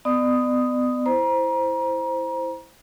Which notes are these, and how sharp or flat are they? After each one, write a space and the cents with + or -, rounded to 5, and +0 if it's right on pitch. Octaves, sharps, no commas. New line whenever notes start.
B3 +30 D5 +40 D#6 +0
E4 +0 C5 +0 A#5 +30